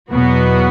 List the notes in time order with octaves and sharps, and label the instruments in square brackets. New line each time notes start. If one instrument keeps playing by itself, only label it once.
[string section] E2 B2 F#3 B3 F#4